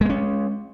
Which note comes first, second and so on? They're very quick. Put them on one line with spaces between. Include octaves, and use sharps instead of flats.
G#3 B3 C#4